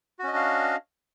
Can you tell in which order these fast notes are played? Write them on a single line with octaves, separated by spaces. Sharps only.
F#4 C#4 D#5 D4 F5